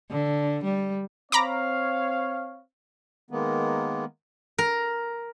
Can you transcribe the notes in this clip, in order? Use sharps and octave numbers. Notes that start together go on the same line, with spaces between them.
D3
G3
C4 C#5 F5 A#5 B5 D6
D#3 G#3 A#3 B3
A#4